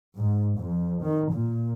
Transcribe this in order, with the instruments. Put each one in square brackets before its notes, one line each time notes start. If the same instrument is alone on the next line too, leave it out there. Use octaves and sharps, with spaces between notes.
[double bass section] G#2
F2
D#3
A#2